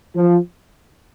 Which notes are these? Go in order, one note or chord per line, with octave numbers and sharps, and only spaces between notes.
F3